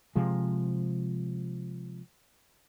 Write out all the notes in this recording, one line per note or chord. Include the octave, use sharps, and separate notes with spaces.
C3 F3 G#3